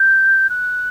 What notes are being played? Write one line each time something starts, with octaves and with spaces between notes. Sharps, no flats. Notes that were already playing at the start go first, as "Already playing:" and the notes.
Already playing: G6
F#6